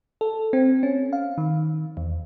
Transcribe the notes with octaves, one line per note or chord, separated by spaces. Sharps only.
A4
C4
C#4
F5
D#3
E2